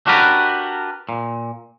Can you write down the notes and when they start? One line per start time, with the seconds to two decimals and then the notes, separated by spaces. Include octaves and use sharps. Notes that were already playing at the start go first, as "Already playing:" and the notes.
0.07 D4 F#4 G4 A#4 B4 D5
1.09 A#2